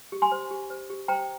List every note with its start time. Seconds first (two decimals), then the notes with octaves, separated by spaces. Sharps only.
0.12 G4
0.22 G#5 C6
0.32 C5
0.51 G4
0.70 C5
0.90 G4
1.08 C5 G5 A#5